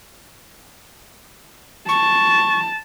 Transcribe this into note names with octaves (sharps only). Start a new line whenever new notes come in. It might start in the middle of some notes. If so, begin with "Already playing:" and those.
A5 C#6